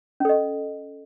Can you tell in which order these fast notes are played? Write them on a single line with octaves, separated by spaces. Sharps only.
C#4 A4 D#5